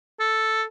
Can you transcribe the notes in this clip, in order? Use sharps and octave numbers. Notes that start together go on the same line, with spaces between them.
A4